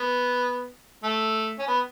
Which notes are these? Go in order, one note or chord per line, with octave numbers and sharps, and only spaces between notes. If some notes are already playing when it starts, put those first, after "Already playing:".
Already playing: B3
A3
C#4
B3